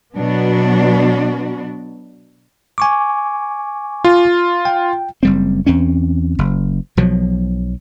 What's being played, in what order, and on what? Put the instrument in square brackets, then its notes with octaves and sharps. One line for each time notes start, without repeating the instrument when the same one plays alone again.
[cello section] B2 F#3 B3 D4 F#4
[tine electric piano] G#5 C#6 D6
[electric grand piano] F4
[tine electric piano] G5
[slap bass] F#1 G3 C4
E2 C4 C#4
F#1
B1 B2 F3 F#3